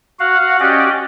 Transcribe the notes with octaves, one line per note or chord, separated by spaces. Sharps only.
F#4 F5 F#5
C#4 F#4 G4 D5 D#5